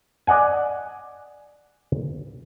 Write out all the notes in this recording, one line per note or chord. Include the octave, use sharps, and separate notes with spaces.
D5 D#5 F#5 G#5